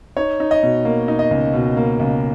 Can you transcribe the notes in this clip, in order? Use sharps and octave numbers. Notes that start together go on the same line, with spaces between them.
D#4 C#5
D#4
D#5
B2
A#3
D#4
D#5
C#2
B2
A#3
C#2